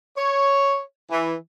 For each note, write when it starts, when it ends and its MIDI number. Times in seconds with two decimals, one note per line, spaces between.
0.17 0.80 73
1.11 1.34 52